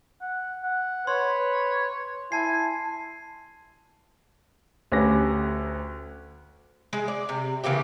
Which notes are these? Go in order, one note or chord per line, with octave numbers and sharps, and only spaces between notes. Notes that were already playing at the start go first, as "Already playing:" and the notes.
F#5
F#5
B4 C#5 C6
E4 G#5 A5 C7
D2 C#4 G4 B4 A#6
G#3
D5
C3
C#3 E3 A#3 G4